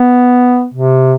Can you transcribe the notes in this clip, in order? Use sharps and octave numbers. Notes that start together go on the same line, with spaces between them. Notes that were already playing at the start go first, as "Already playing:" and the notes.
Already playing: B3
C3